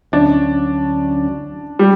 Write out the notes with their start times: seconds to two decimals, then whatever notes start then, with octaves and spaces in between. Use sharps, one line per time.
0.12 D2 D3 F#3 C#4 D4
1.79 G3